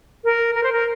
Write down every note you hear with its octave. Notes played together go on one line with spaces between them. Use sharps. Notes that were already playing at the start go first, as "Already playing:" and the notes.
A#4
A#4
C5
A#4